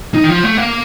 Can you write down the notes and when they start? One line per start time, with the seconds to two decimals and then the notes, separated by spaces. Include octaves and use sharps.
0.14 D#4
0.24 D#3
0.29 F3
0.43 A3
0.57 A#3